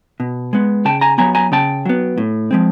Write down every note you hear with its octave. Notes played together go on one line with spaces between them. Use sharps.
B2
G#3 B3
C#3 G5 A5
G#5 A#5
F#3 B3 G#5 A#5
G#5 A#5
C#3 G5 A5
F#3 B3
A2
F3 G#3 C4